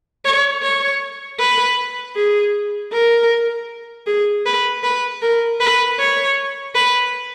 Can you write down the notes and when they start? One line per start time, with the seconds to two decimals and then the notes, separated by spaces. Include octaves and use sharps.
0.25 C#5
0.62 C#5
1.39 B4
2.16 G#4
2.93 A#4
4.07 G#4
4.46 B4
4.84 B4
5.22 A#4
5.60 B4
6.00 C#5
6.75 B4